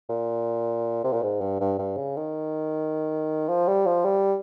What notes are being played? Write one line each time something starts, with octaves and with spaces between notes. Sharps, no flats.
A#2
C3
A#2
G#2
G2
G2
G2
C#3
D#3
F3
G3
F3
G3